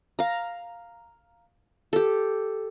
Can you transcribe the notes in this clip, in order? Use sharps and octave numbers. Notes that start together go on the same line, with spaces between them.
F5 A#5
G4 A4